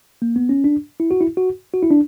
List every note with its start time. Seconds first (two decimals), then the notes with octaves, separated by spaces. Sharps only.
0.22 A#3
0.36 B3
0.49 C#4
0.64 D4
1.00 E4
1.11 F#4
1.21 E4
1.37 F#4
1.74 F#4
1.83 E4
1.91 D4